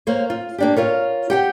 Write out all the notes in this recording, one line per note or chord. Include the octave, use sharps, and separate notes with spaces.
A#3 C5 C#5
F4
A#3 D4 G4
F4 A#4 C#5
G4 F#5 G5